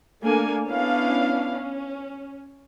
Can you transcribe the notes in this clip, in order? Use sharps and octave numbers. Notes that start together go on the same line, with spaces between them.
A3 A#3 D4 A4 G#5
B3 C#4 D4 E4 F5
C#4